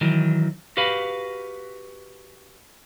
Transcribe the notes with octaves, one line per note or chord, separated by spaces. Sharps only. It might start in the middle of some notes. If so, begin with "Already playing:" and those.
D#3 E3 F#3
F#4 G4 B4 F5 B5